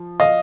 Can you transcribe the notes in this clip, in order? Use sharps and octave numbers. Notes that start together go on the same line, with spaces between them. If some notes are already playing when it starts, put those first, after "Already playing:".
Already playing: F3
D#5 F5